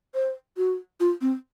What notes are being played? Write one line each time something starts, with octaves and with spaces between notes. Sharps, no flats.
C5
F#4
F4
C4